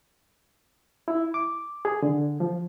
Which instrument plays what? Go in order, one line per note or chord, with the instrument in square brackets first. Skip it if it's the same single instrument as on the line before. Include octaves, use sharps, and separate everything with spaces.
[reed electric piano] E4
D6
G#4
D3
F3